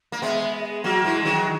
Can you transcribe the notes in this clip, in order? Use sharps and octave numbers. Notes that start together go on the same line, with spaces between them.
A#3
G#3 B3 E5
E5
G#4
F#3 A#3 F#4
E3 G#3 E4
G#3
D#3 F#3 G#4